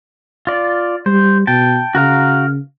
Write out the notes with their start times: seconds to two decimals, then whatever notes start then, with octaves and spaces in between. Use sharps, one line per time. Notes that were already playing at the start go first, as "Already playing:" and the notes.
0.47 F4 D5
1.06 G3 C5
1.47 B2 G5 A5
1.95 C#3 F#4 A#4 F5